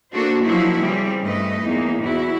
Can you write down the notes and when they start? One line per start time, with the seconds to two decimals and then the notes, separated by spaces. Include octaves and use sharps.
0.13 A#3 D4 F#4 A4 C5
0.44 F3 F#3 A#3 D#4 E4 F#4
0.79 C#3 E3 G3 C4
1.22 G2 A3 B4 D#5
1.64 E2 A#3 D#4
2.00 E2 E4 F#4